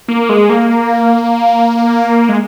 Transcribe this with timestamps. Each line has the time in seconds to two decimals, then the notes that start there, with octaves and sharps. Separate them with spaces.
0.08 A#3
0.29 G#3
0.50 A#3
2.29 G#3